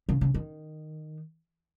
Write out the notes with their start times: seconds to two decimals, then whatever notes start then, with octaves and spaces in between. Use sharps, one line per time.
0.09 C#3
0.21 C#3
0.34 D#3